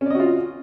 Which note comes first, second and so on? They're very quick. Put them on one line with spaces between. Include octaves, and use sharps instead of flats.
C#4 D5 D#5 F#4 F4